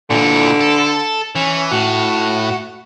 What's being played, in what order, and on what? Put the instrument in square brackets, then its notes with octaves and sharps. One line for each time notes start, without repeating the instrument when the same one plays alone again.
[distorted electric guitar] A#2 E3 [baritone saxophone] D3
[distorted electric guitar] A4
[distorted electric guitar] E3 [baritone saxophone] C#4
[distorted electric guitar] A2 [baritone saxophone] F#4